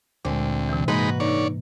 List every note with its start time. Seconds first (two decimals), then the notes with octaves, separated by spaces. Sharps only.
0.25 D2 A#2 G#3 C4
0.69 C3 E3
0.88 G#2 G#3 A#3 D#4 F#4 B4 D#5 B5
1.20 D3 D#4 C#5 D5